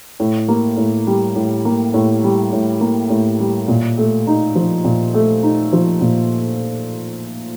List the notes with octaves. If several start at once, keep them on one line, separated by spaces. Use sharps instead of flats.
A2
A#3
A2
G3
A2
A#3
A2
G3
A2
A#3
A2
G3
A#2
A3
D#4
F3
A#2
A3
D#4
F3
A#2